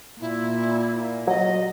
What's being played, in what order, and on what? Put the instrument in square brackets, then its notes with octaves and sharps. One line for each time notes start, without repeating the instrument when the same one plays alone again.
[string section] A#2 [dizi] E4
[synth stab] F#3 [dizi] D#5